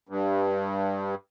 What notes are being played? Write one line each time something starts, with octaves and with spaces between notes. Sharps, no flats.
G2